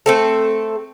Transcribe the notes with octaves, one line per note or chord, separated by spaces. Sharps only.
A3 C4 A4